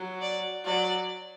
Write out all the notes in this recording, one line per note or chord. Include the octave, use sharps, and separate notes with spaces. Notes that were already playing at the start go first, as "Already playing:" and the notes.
Already playing: F#3
D5
F#3 D5